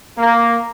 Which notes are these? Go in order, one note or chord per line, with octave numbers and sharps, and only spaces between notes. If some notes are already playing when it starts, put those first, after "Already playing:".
A#3